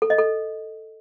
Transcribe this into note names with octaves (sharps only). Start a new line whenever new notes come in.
A4
D#5
A4